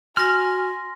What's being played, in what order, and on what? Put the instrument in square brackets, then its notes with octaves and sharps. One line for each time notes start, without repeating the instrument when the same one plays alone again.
[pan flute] F#4 [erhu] G#5 [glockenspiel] C6 A#6 [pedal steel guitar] F6